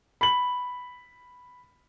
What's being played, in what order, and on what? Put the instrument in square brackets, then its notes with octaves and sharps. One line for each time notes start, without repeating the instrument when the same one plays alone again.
[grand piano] B5 F#7